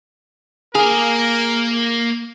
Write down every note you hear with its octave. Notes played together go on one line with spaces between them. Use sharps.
A#3 G#4 A#4 F5